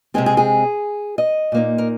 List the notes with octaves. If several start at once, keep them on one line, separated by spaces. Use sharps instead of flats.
C3 G#3 C4 G#4
G#4
G#4
D#5
A#2 A#3 D#4
A#4